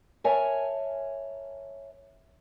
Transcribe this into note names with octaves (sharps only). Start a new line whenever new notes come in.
A#4 C#5 E5 G#5 A5